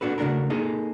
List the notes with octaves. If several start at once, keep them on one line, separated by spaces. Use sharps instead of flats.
A#2 D4 F#4 A4 B4
C#3 A3 D4 F#4 A#4
A#3 D#4 G#4 A4